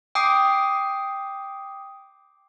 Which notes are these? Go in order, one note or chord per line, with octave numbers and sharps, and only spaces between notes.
G5 D6 D#6 C7